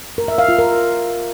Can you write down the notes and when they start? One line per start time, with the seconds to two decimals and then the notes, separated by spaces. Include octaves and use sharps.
0.18 A#4
0.28 E5
0.38 F5
0.49 F4
0.59 A#4